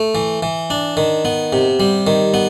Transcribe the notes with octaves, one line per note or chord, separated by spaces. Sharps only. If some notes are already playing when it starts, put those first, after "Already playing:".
Already playing: A3
E3
E3
D4
D#3
B3
C3
G3
D#3
B3